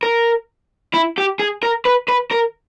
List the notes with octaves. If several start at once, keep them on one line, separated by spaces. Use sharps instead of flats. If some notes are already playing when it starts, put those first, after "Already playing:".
A#4
E4
G4
G#4
A#4
B4
B4
A#4